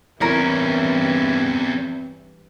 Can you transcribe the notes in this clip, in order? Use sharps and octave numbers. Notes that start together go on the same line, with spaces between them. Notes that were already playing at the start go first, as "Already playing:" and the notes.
E2 G2 E3 C4 C#4 E4 A#4 C#5